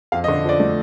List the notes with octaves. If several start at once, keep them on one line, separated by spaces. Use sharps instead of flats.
F2 F5
D#5
D3
F3 D5
A3